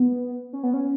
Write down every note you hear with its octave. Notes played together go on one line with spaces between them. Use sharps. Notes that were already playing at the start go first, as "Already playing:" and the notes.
Already playing: B3
C#4
B3
C#4